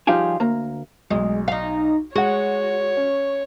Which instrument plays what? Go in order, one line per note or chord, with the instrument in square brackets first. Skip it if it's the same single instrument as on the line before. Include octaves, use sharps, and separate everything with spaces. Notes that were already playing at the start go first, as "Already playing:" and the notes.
[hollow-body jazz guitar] F3 G3 D#4 F4 G4 G#4
D2 A#3 A#5
[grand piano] B1 [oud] G#3
[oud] D#4 F5
[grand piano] G#3 F#5 [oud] F#4 [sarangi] C#5
[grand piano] C#4